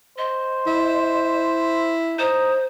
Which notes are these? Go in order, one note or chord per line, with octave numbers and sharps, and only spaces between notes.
C5 D#5
E4
D#4 C5